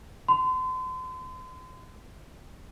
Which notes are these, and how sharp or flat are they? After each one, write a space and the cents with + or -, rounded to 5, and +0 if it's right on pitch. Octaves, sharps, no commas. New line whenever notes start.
C6 -40